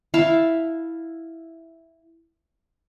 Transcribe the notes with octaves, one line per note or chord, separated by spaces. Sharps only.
E4 F5 A5